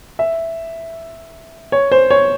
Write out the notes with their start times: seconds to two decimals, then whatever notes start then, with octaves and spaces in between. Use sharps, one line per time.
0.19 E5
1.72 C#5
1.92 C5
2.10 C#5